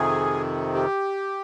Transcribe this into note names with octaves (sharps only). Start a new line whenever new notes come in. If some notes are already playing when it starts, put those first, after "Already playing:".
Already playing: F2 C3 D#3 G#4
G4